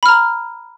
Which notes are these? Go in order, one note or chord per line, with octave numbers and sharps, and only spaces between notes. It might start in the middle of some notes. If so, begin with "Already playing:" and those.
A#5 B5 F6